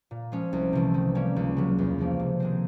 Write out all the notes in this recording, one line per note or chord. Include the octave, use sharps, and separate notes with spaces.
A#2
F3 G#3 C#4
C2
C3 E3 A3
D#3
G3 A#3 C#4
C#2
C#3 F#3
E2
C#3 F3 A#3 C#4
C3
D#3 G#3 C4